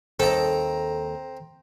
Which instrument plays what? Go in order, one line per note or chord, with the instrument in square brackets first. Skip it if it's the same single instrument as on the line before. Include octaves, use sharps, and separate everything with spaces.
[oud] D#2 A4 [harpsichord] C4 A#5